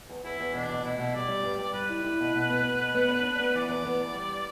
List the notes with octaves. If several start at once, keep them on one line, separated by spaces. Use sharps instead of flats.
E2
E2 E4
E2
B2 D4
B2
B2 E4
B2
G3 D5
G3
G2
G2
G3 B4
E4
E4
B2
B2
B3
B3
B2
B3
D4
D4
B3
E3 D5
E2
B3
E2
G3